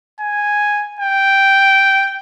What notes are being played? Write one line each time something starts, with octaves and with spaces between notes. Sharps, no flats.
G#5
G5